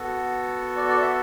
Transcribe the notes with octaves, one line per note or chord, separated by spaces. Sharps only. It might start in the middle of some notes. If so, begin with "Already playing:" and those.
Already playing: B3 F#4 A4
D5
D5
E5